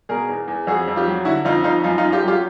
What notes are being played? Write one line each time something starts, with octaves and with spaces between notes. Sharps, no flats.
B2 G#4 A#4
E2
E2
F2 F#4 G#4
F2
F4 G4
F#3
D3 E4 F#4
F2 D#4 F4
F2 D#4 F4
F#2 D#4 F4
D#4 F4
F#2
F4 G4
F#3 F4 G4